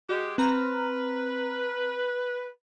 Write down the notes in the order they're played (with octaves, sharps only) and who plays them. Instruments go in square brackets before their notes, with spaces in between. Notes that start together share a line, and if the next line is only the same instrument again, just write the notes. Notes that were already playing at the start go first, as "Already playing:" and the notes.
[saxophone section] G#3 G4 [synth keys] F#4
[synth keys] C4 A#5 F6 [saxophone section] B4